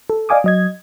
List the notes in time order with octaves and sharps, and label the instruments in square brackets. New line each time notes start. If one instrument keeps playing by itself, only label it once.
[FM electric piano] A4
D5 D#5 F5 G#5 D6 D#6
F#3 D#5 G#6